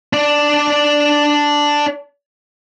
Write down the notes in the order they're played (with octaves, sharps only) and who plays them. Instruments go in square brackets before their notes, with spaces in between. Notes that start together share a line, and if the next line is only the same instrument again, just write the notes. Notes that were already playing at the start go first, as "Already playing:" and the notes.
[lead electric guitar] D4 D5